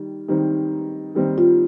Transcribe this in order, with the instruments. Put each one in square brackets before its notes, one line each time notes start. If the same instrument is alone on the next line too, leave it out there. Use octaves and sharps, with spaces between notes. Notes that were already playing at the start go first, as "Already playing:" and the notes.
Already playing: [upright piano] D#3 G3
D#3 G3 C4 D#4
D#3 G3 C4 D#4
[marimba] F4